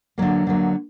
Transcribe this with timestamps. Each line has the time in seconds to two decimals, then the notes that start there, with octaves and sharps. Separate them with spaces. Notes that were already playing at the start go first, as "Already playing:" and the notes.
0.18 D3 F#3 A#3
0.47 D3 F#3 A#3